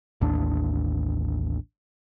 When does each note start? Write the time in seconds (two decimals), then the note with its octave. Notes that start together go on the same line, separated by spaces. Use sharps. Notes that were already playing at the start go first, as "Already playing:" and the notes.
0.21 A1 D#2 D4